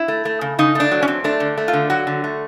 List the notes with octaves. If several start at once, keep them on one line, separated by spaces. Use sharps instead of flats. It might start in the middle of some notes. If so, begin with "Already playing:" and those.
Already playing: E4
A3
A3
C#3
C#3 D#4
A3 D4
F#3
C#4
C4
A3 D4
D3
A3
F4
D3
F#3 F#4
D3
A3